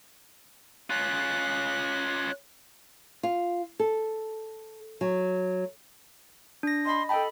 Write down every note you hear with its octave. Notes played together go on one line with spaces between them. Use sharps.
C#4 F4 F#6
F4
A4
F#3
D4 A#6
D#5 B5 C6
A4 D#5 G5 A5 B5